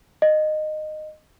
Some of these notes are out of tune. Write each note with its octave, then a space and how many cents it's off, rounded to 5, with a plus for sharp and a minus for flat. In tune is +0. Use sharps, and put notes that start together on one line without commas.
D#5 -15